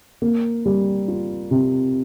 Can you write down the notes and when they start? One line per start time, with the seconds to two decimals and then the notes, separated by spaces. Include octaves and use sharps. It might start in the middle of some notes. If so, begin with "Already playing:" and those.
0.22 A#3
0.66 G3
1.08 F4
1.51 C3